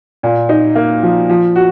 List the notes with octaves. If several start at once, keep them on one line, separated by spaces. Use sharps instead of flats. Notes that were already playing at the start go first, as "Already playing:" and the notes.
A#2
D#4
A#3
F3
F3
F#4